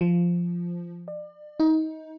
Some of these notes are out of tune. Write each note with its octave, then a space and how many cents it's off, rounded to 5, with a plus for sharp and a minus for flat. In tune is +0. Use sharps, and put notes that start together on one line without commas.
F3 -5
D5 +35
D#4 +25